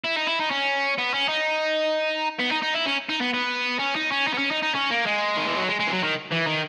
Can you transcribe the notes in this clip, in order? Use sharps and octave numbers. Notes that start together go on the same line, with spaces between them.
E4
D#4
E4
D#4
C#4
B3
C#4
D#4
B3
D#4
D#4
E4
C#4
D#4
B3
B3
C#4
D#4
C#4
D#4
B3
C#4
D#4
D#4
C#4
A#3
G#3
D#3
E3
F#3
G#3
G#3
E3
F#3
D#3
E3
D#3